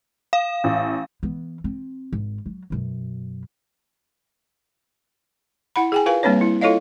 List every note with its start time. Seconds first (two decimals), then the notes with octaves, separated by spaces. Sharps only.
0.33 F5
0.64 A1
1.23 E3 B3
1.64 C4
2.13 G#1
2.46 F#3
2.70 F#2 B2
5.76 E4 F#5 B5
5.92 G#4 G5 G#5
6.06 F4 A#4 B4 F5 G#5
6.23 G3 A#3 C4 D4 B4 C#5
6.41 E4
6.61 E4 F4 A4 C#5 D#5 F5